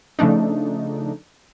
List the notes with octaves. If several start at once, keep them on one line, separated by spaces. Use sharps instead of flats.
C#3 F3 A3 D4 D#4